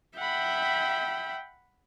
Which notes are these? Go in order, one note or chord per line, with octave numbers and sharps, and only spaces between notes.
E5 F#5 G5 B5